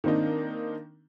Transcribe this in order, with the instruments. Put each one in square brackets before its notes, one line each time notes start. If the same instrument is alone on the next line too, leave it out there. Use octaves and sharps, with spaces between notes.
[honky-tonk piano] D#3 A#3 C4 D4 D#4